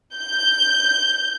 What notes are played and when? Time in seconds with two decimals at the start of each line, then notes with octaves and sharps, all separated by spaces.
0.15 G6